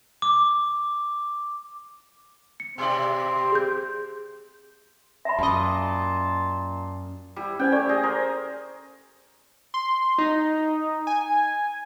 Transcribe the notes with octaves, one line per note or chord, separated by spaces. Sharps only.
D6
C#7
B2 C4 G4 D5
G#4 G6
E5 A5 B5 C6
F#2 A#2 D#5
G3 E4
C#4 C5 G5 G#5
A3 G4 D5
G#4 D#5
A#4 C5
C6
D#4
G#5